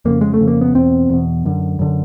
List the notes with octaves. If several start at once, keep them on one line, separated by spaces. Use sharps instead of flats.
F2 C#3 A#3
G#3
A3
F2 C#3
A#3
B3
E2 B2 C4
E2 B2
F#2 D3
F#2 D3